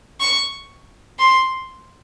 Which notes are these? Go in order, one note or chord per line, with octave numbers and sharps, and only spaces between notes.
C#6
C6